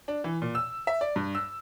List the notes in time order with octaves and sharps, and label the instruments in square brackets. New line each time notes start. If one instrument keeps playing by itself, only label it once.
[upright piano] D4
E3
A#2
E6
E5
D5
G2
E6